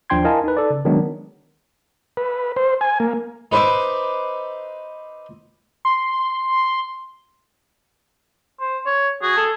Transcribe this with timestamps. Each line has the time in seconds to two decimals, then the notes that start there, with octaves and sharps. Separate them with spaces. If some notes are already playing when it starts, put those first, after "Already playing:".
0.10 D#2 F3 D4 G5 C6 G#6
0.24 E4 A#4 D#5 F5 G#5 A5
0.44 D#4 B4
0.57 A4 D5
0.70 C#3
0.85 D#3 F#3 G#3 B3 D4 D#4
2.17 B4
2.56 C5
2.81 G#5
3.00 A#3
3.52 D#4 B4 C5 E5 D6
5.85 C6
8.60 C5
8.86 C#5
9.22 F#4 G#4
9.37 A4